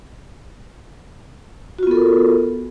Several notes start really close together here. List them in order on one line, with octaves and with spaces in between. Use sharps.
F#4 F4 B3 A4 A#4